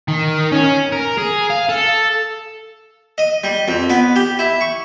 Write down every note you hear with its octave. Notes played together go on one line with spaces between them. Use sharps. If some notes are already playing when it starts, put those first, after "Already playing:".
D#3
C#4
A#4
G#4
F5
A4
D#5
G3
F2
B3
G4
E4
C#6